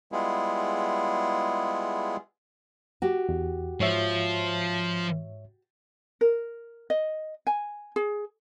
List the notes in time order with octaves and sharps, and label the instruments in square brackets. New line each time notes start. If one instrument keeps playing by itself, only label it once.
[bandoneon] G3 G#3 B3 E4 F4 G#4
[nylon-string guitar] F#4 G4
[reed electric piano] E2
[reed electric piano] G#2 C#5 E5 [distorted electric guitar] F3
[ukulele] A#4
D#5
G#5
G#4